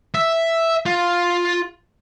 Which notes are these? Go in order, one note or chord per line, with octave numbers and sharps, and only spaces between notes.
E5
F4